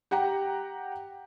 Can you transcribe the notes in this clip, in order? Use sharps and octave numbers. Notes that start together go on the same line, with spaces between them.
G4 F#5 G5 A#5